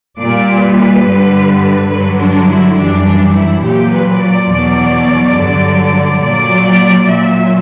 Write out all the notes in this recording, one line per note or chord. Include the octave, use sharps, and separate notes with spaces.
A#2 G3 D5
B4
G2 D3 G3
G2 D3 F#3 B4
D4
E4
F#2 E3 G3 D4
D4
E4
A#2 F#3 G4
B4
D5
E2 B2 F#3
G2 D3 F#3
A#2 F#3 D5
D5
A#2 F#3 E5